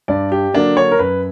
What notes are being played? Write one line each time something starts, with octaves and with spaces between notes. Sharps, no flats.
G2 D5
G4
D3 F#3 A#3 D4
C#5
A#4
F#2 B4